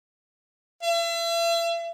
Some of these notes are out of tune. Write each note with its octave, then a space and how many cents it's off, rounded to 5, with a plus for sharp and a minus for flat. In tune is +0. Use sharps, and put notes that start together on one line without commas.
E5 +40